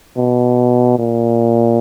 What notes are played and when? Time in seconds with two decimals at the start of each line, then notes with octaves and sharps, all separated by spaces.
0.17 B2
0.99 A#2